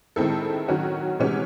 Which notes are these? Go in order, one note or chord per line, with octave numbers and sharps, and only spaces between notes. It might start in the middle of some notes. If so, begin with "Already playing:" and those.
D#3 G#3 C4 E4 A4
D#3 F#3 C#4 F#4
C3 E3 G#3 C#4 F#4